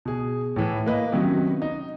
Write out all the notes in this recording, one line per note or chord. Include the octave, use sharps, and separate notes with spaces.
B2 G#4
A2 E3
A#3 B4 D#5
C3 D#3 F#3 B3 C#4
D#4